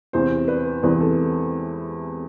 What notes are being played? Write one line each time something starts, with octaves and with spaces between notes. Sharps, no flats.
E2 C3 E3 C5
B4
E2 C3 E3 B4
A4